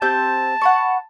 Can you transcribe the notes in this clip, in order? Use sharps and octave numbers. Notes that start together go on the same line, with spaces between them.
C4 G4 A5 G6
F#5 B5 C#6